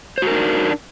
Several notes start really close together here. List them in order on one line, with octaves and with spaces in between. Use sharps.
C5 F#4 A#4 D#4 D4